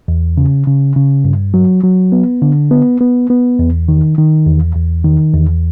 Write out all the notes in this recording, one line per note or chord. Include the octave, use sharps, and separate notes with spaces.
E2
C#3
C#3
C#3
G2
F#3
F#3
B3
D3
B3
B3
B3
E2
D#3
D#3
E2
E2
D#3
E2